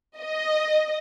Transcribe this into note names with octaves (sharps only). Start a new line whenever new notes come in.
D#5